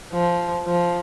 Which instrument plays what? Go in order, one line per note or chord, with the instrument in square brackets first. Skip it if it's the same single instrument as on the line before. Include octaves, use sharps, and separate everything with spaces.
[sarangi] F3
F3